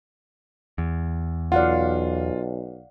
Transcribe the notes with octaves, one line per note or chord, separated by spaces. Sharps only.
E2
B1 F4 D5 F5 F#5